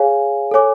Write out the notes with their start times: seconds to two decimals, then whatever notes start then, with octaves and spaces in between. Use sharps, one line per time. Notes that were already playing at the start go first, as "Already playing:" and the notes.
Already playing: G#4 C#5 F5 G#5
0.51 A4 C#5 G#5 D6